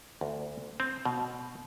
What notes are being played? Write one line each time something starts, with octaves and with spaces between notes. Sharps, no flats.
D2
C4
B2